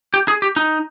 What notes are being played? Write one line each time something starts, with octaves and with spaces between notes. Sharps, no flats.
G4
G#4
G4
D#4